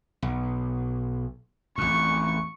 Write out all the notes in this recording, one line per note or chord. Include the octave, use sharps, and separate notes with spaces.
B1
A1 F2 C#6